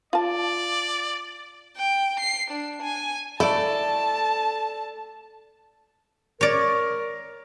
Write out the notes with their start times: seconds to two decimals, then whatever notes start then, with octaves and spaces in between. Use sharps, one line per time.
0.13 F4 D5 A5
1.77 G5
2.20 C7
2.50 D4
2.82 G#5
3.40 A3 E4 A4 D5 A5
6.41 A#4 C#5 D5